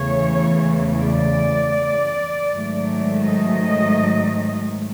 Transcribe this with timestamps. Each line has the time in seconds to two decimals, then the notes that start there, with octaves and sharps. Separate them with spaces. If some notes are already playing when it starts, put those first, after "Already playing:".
Already playing: E2 C#3 E3 A3 C#5
1.06 D5
2.53 G#2 D#3 F#3 A3
3.25 D#5